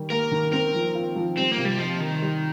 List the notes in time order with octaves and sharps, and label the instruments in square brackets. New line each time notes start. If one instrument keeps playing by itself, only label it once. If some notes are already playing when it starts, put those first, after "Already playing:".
Already playing: [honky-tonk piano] D#3 G3
[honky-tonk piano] A#3 [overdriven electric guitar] A#4
[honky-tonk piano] D#3
[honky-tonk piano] C4 [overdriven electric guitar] A#4
[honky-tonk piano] F3
F4
F3
[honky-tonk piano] G3 [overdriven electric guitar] C4
[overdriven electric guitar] A#3
[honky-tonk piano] C3
[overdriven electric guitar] G3
[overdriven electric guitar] F3 [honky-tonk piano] D#4
[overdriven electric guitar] D#3 [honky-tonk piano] A#4
[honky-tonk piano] G3